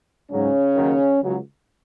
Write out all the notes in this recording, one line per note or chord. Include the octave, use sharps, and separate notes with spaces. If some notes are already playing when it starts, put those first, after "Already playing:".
G#2 C#3 F#3 C#4
D#2 D#3 F#3
C#2 C#3 F#3